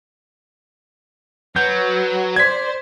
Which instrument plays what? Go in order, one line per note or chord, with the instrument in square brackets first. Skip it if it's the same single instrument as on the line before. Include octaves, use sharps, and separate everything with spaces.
[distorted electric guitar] F#3 [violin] B4 [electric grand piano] G6
[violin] C5 [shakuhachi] D5 [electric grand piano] G#6 B6